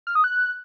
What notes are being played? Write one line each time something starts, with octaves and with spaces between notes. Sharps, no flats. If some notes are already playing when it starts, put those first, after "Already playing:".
F6
D#6
F#6